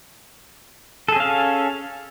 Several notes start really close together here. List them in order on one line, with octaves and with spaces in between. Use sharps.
A4 G#4 C#4 F5